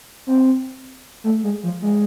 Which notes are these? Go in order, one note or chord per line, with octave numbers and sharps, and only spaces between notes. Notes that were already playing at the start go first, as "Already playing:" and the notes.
C4
A3
G#3
F3
G#3